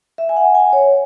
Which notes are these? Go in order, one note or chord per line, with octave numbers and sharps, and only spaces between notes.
E5
G#5
F#5
G#5
C#5